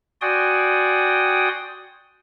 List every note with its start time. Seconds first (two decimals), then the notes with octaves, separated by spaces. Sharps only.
0.21 F#4 D5 G5 G#5 C6 D#6